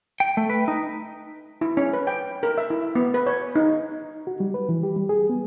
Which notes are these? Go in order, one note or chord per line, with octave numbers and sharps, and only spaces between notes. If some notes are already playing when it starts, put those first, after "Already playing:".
G5
A3
B4
D#4
E4
C#4
B4
G5
A#4
E5
E4
B3
B4
C#5
D#4
F#4
G3
B4
E3
G4
G3
G#4
B3